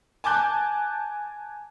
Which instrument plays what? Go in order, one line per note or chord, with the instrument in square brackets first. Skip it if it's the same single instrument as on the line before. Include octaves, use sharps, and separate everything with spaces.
[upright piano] G#5 A5 D6 F#6 G6